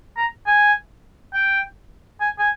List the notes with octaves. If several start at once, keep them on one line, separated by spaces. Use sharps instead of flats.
A#5
G#5
G5
G#5
G#5